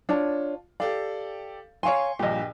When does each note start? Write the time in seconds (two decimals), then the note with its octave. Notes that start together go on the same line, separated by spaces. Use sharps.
0.09 D4 F4 C#5 A5
0.80 G4 A4 D5 F5
1.83 C#5 F5 G#5 C6 C#6
2.19 A#1 G2 A#2 G4 D#5